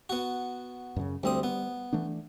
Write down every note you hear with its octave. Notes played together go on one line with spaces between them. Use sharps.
B3 F#4
F#2 C#3
D2 G3 C4 D#6
B3
E3 A3 D4